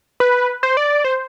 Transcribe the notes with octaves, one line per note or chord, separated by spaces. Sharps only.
B4
C5
D5
C5